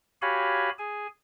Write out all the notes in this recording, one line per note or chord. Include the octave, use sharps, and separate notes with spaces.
F#4 G4 C#5 F5 G#5 B5
G#4 G#5